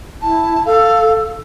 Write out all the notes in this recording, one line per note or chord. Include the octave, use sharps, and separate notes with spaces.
E4 A5
A4 F5